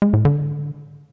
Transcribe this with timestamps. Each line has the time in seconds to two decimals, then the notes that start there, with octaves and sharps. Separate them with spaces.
0.02 G#3
0.13 A2
0.25 D3